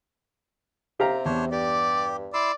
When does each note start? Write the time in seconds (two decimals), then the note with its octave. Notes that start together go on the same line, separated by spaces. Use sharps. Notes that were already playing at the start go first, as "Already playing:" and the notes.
1.00 C3 G4 F5 A#5
1.25 E2 D4 C5 C#5
1.52 G2 G4 D5
2.34 E4 D5 C6 E6